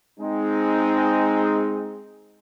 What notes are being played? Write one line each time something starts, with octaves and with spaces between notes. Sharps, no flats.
G#3 C4 D#4